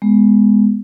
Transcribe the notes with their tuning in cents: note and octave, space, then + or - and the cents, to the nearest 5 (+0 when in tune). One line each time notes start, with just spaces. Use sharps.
G#3 -5 B3 +0